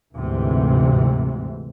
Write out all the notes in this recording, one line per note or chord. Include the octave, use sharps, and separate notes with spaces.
D2 G#2 C3 E3